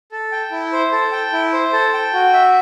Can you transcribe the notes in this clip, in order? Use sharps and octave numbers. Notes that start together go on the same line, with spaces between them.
A4
G5
E4
C5
A4
G5
E4
C5
A4
G5
F#4
E5